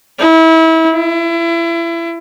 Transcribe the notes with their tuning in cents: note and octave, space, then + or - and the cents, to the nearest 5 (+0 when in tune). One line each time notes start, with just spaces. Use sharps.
E4 -30
E4 +30